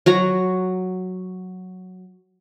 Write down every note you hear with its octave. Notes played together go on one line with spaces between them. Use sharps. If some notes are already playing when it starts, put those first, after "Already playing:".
F#3 F#4 A#5